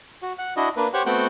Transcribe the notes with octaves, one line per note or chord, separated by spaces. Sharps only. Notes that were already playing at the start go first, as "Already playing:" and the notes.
F#4
F#5
D4 E4 F#4 D#5
A#3 D4 B4
G4 C5 C#5 F#5 C#6
A3 B3 C4 F#4 F#5 G5